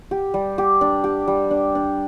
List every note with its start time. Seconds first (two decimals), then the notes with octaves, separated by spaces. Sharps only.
0.11 G4
0.34 G3
0.58 G4
0.81 D4
1.04 G4
1.28 G3
1.51 D4
1.75 D4